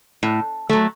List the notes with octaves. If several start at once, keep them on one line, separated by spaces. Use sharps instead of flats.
A2
F#3 A3